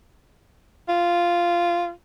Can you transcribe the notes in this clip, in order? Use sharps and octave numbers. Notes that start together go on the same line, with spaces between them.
F4